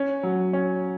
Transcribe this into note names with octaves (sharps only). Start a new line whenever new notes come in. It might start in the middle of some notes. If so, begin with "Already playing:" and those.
Already playing: C#4
F#3
C#4